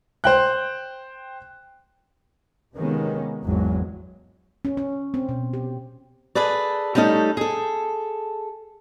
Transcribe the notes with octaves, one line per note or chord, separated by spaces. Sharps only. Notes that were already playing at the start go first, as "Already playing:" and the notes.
C5 G5 F#6
C3 D#3 G#3 A#3 B3 C#4
G#1 E2 F#3 G#3
C#4
C#4
C4
B2
G4
G#4 A4 B4 D5
G3 A3 C#4 D#4 A4
G#4 A4